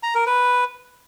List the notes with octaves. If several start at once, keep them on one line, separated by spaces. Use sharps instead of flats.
A#5
A#4
B4